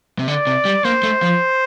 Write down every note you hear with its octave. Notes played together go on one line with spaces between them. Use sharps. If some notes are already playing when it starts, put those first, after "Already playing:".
C3
D3 D5
C3
G3
A#3 C5
A3
F3